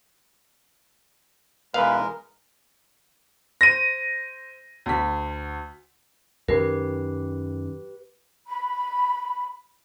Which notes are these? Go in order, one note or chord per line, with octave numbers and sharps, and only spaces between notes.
B1 E3 G#3 A#4 B4 F5
C5 A#6 D#7
D2 B6
F#2 D#3 G4 A#4 B4
B5